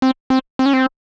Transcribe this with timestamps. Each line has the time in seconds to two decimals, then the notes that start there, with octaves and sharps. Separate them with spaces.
0.02 C4
0.30 C4
0.59 C4
0.66 C#4
0.73 C4